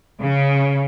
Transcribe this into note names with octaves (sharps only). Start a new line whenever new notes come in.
C#3